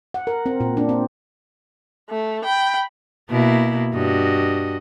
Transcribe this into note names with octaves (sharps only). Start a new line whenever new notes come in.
F#5
A#4
C4
A#2
D4
C4
A3
G5 B5
B2 A#3 E4
G2 F#4 D#5